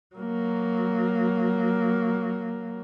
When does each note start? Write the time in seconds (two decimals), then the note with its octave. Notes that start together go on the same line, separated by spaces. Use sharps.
0.15 F#3 A#3